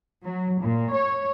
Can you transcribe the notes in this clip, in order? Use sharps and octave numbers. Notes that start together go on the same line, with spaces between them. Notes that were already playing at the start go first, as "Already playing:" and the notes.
F#3
A#2
C#5